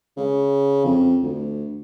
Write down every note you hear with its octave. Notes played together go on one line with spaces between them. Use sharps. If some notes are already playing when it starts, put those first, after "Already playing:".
C#3
F2
D2